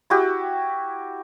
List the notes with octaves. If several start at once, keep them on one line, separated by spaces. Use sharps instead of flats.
E4 F#4 G4